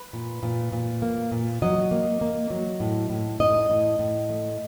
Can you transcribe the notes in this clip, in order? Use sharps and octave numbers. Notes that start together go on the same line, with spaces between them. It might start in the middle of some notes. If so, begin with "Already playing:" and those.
Already playing: B4
A#2
A#2
A#2
A#3
A#2
F#3 D#5
A#3
A#3
F#3
A2
A2
A2 D#5
A2
A2
A3